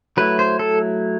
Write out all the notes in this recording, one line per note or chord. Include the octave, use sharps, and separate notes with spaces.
F#3 A3 E4 B4
C5
A4